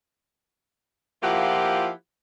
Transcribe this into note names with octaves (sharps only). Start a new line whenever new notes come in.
F3 A#3 E4 F4 G4 F#5